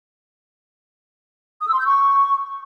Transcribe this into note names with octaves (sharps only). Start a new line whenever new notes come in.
D#6
E6
C6
G6
C#6